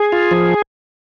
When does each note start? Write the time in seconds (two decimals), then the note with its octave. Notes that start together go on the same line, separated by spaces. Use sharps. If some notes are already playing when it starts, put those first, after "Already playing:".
Already playing: G#4
0.12 F4
0.31 F3